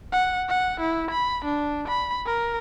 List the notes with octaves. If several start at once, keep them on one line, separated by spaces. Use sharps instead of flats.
F#5
F#5
E4
B5
D4
B5
A#4